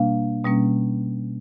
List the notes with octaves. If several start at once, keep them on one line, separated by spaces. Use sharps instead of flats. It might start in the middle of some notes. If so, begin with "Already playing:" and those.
Already playing: B2 G3 A#3 D4 F5
B2 G3 A#3 C#4